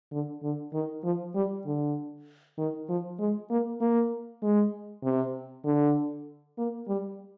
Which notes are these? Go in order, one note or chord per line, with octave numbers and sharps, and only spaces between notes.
D3
D3
D#3
F3
G3
D3
D#3
F3
G#3
A#3
A#3
G#3
C3
D3
A#3
G3